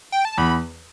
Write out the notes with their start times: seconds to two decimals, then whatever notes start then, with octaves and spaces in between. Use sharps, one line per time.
0.12 G5
0.25 A5
0.38 E2 B5